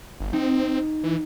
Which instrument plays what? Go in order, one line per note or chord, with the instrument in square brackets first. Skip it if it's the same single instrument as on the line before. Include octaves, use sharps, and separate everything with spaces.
[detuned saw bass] G1
[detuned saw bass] C4 [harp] D#4
[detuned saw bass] E3